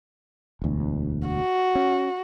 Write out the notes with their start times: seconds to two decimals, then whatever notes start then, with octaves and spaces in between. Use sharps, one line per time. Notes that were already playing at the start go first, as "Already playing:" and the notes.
0.62 E1 D2
1.28 F#4
1.75 C#4